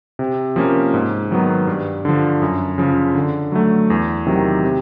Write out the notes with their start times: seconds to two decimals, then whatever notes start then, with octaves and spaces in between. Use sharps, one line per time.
0.19 C3
0.56 F3 A#3 C#4
0.94 G#2
1.31 D#3 F#3 B3
1.67 G2
2.05 D3 F3
2.42 F#2
2.78 C#3 F3
3.15 D3
3.52 F#3 A3
3.90 E2
4.27 C3 D#3 F#3
4.64 C3